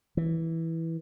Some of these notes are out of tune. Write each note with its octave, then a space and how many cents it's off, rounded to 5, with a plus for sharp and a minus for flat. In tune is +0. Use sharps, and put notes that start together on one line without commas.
E3 -10